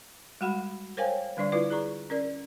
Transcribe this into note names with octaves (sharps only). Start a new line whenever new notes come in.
G3 G#3 F#4 F#5 B5
A#4 C5 C#5 F5 G5 G#5
D3 G3 D4 D5 C#6
E4 F4 B4 D5
G#4 D5 A#5 C#6
C#4 A#4 D5